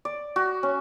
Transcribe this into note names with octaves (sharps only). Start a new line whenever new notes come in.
D5
F#4
C#4